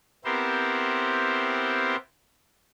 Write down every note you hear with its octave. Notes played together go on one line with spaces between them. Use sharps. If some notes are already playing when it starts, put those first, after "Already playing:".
B3 C4 E4 G4 A#4 C5